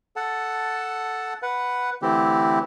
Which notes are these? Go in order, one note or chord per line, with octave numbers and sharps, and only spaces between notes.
A4 F#5 A5
B4 F#5
D3 E3 A3 C4 E4 G4